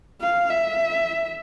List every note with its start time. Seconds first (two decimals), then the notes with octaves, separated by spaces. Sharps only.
0.22 F5
0.50 E5